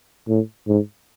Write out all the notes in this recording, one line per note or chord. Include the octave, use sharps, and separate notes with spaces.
A2
G#2